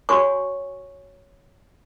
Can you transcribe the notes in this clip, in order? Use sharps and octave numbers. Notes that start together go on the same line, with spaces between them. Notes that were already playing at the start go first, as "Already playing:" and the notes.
F#4 C#5 G#5 C#6